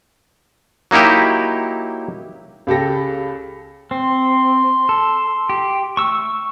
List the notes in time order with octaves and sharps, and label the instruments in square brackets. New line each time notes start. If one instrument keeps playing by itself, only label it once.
[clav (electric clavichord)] F#3 A#3 D#4 E4 G4
[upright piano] C#2 G4 A4 A#6
[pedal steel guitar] C4 [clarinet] C6
[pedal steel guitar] A4
G4
[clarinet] A3 [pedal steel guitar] C#6 E6